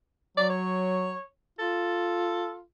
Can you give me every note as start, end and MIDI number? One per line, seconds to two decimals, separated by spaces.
0.37 1.14 54
0.37 0.45 74
0.50 1.21 73
1.59 2.62 65
1.59 2.56 69